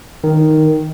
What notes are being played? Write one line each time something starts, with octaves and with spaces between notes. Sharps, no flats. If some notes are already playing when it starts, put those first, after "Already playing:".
D#3